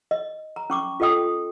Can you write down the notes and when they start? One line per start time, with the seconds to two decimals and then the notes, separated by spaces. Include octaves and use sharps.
0.11 D#5
0.56 A#5
0.70 C#4 C#6 D6
1.00 F4 A4 D#5 G5 D#6